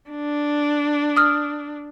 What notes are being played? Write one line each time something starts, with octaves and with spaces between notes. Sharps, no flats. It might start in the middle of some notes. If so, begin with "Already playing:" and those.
D4
D#6 F6